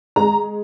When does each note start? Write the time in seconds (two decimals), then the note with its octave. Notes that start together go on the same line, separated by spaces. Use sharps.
0.16 G#3 A#5